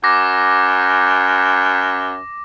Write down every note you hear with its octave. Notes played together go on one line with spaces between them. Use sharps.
F#2 D6 A#6